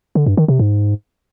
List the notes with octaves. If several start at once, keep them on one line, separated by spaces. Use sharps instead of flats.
D3
G2
D#3
C3
G#2